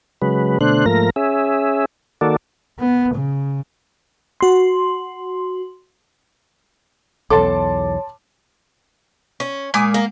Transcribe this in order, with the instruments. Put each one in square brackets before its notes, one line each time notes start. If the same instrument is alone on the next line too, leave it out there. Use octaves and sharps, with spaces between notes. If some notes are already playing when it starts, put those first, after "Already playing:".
[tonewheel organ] C#3 F#3 G#3 B4
B2 D3 A3 D4 C5 F#6
G#2 F3 A3 A#3 A#4 A#6
C#4 G#4 E5
D#3 A#3 F#4 A4 D5
[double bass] B3
C#3
[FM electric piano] F#4 C6
[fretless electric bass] B1 E2 [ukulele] A4 [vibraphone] C#5 [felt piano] A5 C6 D6
[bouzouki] C#4
[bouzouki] A#2 [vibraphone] G#3 [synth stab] G#5 D6 D#6
[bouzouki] A#3